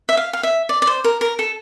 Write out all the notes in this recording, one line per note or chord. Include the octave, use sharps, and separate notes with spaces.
E5
F5
F5
E5
D5
D5
C5
A#4
A#4
A4